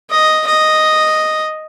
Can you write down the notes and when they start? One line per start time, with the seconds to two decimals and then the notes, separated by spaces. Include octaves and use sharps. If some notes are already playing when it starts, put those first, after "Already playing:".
0.10 D#5
0.47 D#5